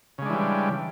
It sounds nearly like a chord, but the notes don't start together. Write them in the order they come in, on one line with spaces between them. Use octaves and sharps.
C#3 G#3 D4 E3 G3